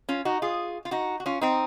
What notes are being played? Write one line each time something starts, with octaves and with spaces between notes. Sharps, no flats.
C#4 F4
D#4 F#4
F4 G#4
F4
D#4 F#4
F#4
C#4 F4
C4 D#4